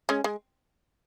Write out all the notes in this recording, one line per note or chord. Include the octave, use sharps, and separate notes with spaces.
G#3 C#4
G#3